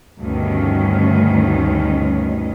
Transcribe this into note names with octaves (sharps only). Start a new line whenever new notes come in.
D2 G2 B2 D#3 C#4